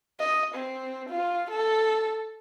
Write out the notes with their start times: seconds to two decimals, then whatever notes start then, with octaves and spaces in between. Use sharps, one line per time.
0.19 D#5
0.55 C4
1.09 F4
1.50 A4